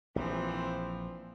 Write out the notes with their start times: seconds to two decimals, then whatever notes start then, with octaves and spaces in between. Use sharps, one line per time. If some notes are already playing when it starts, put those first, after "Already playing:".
0.16 A#1 E3 F3 C4